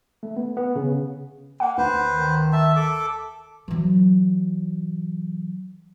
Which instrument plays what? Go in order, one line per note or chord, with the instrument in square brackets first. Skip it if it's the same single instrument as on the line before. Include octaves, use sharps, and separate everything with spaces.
[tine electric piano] A3
B3
B3
C#3
[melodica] A#3 [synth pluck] F#5
[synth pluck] D2 [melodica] B4 C5
[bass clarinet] D#3
[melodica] E5 A5
A4 D6
[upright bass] E3 F#3